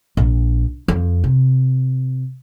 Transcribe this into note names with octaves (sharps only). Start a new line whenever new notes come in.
A#1
F2
C3